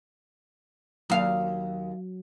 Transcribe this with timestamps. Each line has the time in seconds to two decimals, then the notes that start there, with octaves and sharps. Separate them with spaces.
1.10 D#2 F#3 F5